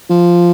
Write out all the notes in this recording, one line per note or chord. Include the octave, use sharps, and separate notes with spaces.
F3